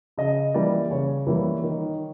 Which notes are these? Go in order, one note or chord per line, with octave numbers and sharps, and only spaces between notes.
C#3 D#5
E3 G3 A#3 D5
C#3 C#5
E3 G3 A#3
D#3